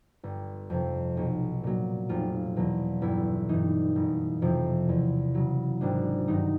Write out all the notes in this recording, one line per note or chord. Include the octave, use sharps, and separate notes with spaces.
G1
F2 C3
B1
A#2 F#3
F1 F4
E2 B2 F#3
G1 E4
G2 E3 D#4
F#1
F2 C3 F3
E2
C#3 F#3
G#1 D4
G2 D#3 F#3 D#4